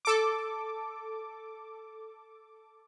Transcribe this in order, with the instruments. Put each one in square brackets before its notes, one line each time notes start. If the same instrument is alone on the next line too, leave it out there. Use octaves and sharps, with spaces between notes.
[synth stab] A4 D6